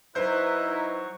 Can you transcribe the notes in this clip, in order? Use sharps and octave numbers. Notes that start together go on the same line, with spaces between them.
F#3 D#4 E4 B4 C5 C#6 G6